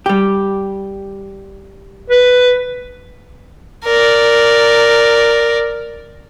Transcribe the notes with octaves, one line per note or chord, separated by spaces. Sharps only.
G3 G4
B4
A#4 D5